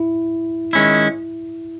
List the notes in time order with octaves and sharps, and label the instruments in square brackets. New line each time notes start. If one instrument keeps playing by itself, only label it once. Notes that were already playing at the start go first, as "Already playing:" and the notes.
Already playing: [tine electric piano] E4
[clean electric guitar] D#3 G#3 C#4 E4